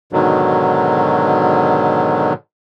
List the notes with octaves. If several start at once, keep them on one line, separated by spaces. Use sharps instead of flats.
G#2 B2 D3 D#3 F#3